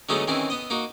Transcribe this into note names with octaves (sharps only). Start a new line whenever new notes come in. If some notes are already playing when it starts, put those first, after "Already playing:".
D3 F#3 G#3 A3 B3 D#4
D#3 E3 C4 C#4 E4
B3 D#5
A#3 D#4 F#4